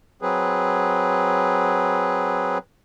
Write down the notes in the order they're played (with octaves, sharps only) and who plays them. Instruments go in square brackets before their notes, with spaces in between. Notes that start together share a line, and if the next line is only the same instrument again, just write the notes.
[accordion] F#3 C4 G#4 B4